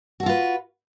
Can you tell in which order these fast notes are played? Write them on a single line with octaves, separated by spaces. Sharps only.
F#4 A4 F4 B4